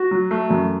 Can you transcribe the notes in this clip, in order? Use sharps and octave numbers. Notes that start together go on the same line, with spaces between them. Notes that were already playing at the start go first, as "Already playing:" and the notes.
Already playing: F#4
F#3
A3
F#2